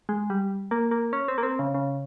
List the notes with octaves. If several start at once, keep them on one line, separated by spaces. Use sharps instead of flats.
G#3
G3
A#3
A#3
C#4
C4
A#3
C4
C#3
C#3